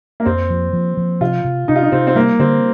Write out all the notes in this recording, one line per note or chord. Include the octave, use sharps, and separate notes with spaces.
A#3
F2 C4
F3
F3
F3
C3 F4
C3
C3 D#4
F4
D#4
C3 C4
C4
G3 A#3
D3 C4